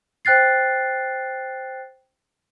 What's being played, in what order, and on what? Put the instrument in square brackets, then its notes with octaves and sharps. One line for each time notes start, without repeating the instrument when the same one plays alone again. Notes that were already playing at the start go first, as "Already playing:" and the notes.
[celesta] C5 G5 F#6 A6 C7